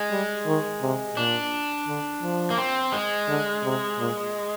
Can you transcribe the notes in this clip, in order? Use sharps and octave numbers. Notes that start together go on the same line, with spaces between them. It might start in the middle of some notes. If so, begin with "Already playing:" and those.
Already playing: G#3
G3
D#3
C3
A#2 D4
D3
F3
A#3
C4
G#3
D3
C3
A#2